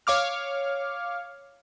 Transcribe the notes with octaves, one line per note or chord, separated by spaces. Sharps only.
C#5 F5 D6 F6